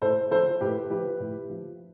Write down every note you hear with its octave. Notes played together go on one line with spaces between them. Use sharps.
A2 A4 C5
F3 A4 C5
A2 G4 B4
F3 G4 B4
A2
F3